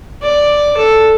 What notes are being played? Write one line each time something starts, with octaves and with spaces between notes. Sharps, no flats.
D5
A4